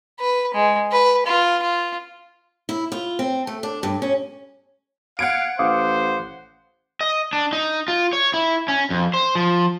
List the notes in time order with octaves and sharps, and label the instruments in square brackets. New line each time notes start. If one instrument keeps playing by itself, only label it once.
[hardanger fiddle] B4
G#3
B4
F4
F4
[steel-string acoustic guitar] E4
F4
C4
A3
D4
G2
C#4
[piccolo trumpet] F5 [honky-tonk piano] F#5 G#6 D7
[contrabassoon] A1 [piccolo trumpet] C5 [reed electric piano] F5 D6 D#6
[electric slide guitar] D#5
D4
D#4
F4
C#5
E4
C#4
F2
C5
F3